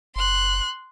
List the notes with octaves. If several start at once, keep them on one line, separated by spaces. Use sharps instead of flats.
F#1 C6 F#6